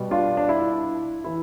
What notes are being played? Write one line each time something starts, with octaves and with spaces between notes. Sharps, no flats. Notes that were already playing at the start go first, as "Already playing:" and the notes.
Already playing: B2 G3
D4 F4
D4
E4
E3 E4